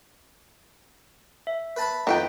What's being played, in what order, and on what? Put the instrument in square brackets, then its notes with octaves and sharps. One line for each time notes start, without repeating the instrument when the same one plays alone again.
[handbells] E5
[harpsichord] B4 A5 B5
[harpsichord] F2 [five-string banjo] D#3 B4 G5